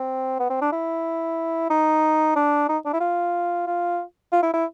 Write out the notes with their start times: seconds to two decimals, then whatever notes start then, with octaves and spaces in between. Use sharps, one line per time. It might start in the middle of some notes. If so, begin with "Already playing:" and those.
Already playing: C4
0.40 B3
0.50 C4
0.61 D4
0.72 E4
1.70 D#4
2.36 D4
2.69 D#4
2.85 D4
2.93 E4
3.00 F4
3.67 F4
4.32 F4
4.42 E4
4.54 E4